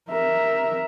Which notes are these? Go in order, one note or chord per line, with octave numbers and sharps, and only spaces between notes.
A#4 E5